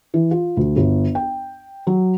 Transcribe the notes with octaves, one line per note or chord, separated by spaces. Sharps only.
E3
F4
D2
G1
G5
F#3